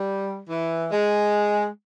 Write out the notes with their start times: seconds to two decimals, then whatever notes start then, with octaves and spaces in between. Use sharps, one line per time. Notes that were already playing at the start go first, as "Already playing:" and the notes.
Already playing: G3
0.49 E3
0.91 G#3